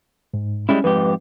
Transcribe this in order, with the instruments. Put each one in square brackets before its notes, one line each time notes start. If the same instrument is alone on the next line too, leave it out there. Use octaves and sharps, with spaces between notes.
[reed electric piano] G#2
[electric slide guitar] G3 G#3 E4 [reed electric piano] C#4
[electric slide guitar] F2 G#2 G4 [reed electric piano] B4